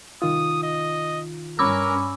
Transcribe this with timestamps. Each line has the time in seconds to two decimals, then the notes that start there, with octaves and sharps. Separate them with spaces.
0.22 C2 D#3 F4 D#6
0.63 D#5
1.59 G2 C#4 A#4 B5 D6 E6